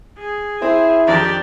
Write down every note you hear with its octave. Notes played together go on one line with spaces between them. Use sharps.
G#4
C4 E4 C5
F2 D#3 D4 G4 D5 A#5